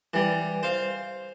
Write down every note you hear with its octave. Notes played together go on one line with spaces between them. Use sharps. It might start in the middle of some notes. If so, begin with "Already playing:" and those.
E3 G3
C5 F5